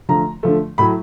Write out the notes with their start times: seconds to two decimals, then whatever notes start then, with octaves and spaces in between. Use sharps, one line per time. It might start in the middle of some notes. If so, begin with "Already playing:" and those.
0.09 D3 F3 A3 A#5
0.43 D3 F3 A3
0.78 A2 F#3 A3 B5